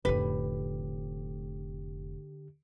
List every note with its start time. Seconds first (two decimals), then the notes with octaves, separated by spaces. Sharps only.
0.05 F1 A2 D3 G4 B4